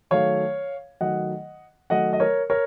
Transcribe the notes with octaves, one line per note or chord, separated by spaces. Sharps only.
D#3 F#3 A3 C#5 F5
D#3 F#3 A3 D#5 F#5
D#3 F#3 A3 D#5 F#5
D#5
A#4 C#5
A#4 C#5